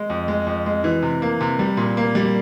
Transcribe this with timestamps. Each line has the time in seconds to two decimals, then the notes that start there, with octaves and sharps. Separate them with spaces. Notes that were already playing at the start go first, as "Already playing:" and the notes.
Already playing: G#3
0.10 F2
0.28 G#3
0.47 F2
0.66 G#3
0.84 E3
1.02 C3
1.22 A#3
1.41 C3
1.59 G3
1.77 A#2
1.97 A#3
2.15 G3